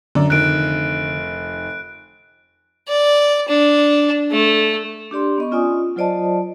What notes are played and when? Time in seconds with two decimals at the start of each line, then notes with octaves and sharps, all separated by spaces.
0.15 F#2 D3 D5
0.30 F1 D#3 F#6 D7
2.88 D5
3.48 D4
4.31 A3
5.11 D4 G4 D5 C6
5.38 B3 D#5 C#6
5.52 C#4 F4 D5 G#5 D#6
5.96 F#3 F4 C5 D5 D#5 A5